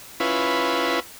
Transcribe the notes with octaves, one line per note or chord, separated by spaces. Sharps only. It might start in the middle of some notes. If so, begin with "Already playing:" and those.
C#4 E4 F4 B4